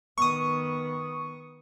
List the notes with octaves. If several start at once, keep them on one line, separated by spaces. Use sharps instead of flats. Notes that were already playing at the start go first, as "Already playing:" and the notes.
D#3 B3 C#6 D#6